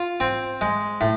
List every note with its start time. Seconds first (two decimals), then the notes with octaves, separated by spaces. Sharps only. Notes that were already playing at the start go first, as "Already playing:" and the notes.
Already playing: F4
0.20 C4
0.61 G#3
1.01 A2